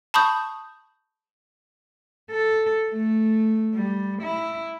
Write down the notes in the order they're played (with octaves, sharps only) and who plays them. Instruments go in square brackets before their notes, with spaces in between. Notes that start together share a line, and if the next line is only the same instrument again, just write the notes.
[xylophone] A5 B5 C#6 D#6 G6
[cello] A4
A3
G3
E4